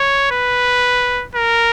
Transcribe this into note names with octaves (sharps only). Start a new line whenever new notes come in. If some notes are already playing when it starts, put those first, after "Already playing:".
Already playing: C#5
B4
A#4